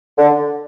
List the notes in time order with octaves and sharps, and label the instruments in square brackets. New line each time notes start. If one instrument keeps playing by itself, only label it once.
[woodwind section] D3